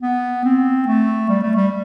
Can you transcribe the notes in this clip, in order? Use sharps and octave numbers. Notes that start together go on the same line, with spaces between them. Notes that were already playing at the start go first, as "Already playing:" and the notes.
B3
C4
A3
G3
A3
G3